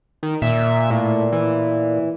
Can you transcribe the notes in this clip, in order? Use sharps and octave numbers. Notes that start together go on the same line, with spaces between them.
D#3
A#2 E5
A2
E3